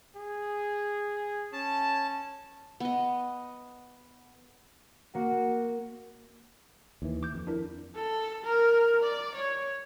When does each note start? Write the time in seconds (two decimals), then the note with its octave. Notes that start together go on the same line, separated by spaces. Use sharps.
0.16 G#4
1.53 C#4 A5
2.80 B3 D#5
5.15 A#3 F#4
7.02 D#2 E3
7.23 D6 G6
7.34 F2
7.47 D4 E4 A#4
7.95 A4
8.44 A#4
9.03 D5
9.34 C#5